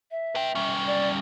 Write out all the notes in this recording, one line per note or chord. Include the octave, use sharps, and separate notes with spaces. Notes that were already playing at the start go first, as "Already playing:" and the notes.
E5
B4 G5
G3 C#4
D5